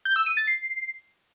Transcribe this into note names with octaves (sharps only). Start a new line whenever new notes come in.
G6
E6
D#7
A6
C7